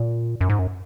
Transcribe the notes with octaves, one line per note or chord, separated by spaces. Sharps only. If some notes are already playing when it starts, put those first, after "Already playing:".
Already playing: A#2
F#2
G#2
F#2